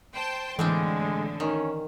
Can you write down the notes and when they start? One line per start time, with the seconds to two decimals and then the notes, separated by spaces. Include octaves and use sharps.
0.14 C5 G5 A5
0.59 A2 D3 E3 G3 G#3 C4 D4
1.40 D#3 C#4